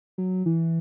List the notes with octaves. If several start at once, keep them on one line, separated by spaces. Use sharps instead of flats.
F#3
E3